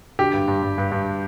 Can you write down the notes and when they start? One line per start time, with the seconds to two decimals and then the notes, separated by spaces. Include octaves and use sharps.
0.19 D3 G4
0.33 G2
0.48 G2
0.62 G2
0.78 G2
0.92 G2